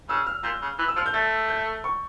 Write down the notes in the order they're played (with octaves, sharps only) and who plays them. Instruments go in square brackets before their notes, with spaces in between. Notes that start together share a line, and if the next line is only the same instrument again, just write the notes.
[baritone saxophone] C#3 [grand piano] E6
[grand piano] F6
[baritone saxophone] A#2 [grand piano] G6
[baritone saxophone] C#3
E3
[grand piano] E6
[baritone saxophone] F3 [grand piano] F6
[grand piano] G6
[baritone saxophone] A3 [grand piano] A6
[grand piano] G6
C#6